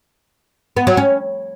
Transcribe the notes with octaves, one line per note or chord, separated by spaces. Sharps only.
B3
F#3
C#4